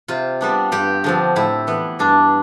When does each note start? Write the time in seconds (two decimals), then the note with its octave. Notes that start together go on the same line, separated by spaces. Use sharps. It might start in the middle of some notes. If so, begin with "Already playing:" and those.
0.08 C3 F4
0.41 G3 B3 D4
0.72 G2 G4
1.04 D3 F3 C4
1.36 A2 E4
1.67 E3 B3
1.99 G2 D4